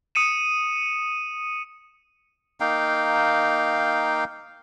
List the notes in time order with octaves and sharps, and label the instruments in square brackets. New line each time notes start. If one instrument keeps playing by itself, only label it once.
[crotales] D#6 C#7 D#7 E7
[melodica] A#3 D#4 F5 G5